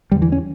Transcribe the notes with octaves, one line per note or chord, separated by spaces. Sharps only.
E2 D3 G3
E3
C#4